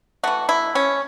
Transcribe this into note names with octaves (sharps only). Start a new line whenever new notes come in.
E3 A3 F#4
E4
C#4